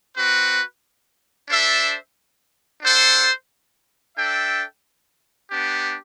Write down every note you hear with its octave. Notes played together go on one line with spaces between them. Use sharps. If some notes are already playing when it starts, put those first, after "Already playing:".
C4 F#4 B4
D4 A4 C5 E5
D4 A4 C5 F#5
D4 A4 E5 G5
B3 D4 G4